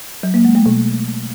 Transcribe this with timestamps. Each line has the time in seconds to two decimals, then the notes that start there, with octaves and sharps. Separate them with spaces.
0.23 F#3
0.34 A#3
0.45 G#3
0.55 A3
0.66 B2